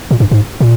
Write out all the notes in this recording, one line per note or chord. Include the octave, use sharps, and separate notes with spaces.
A#2
G2
G#2
A#2